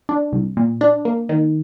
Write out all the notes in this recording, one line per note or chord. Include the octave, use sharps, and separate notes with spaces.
D4
C2
A#2
D4
A#3
D#3